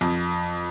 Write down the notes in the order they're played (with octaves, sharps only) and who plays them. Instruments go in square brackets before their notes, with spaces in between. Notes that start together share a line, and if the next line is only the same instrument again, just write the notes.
[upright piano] F2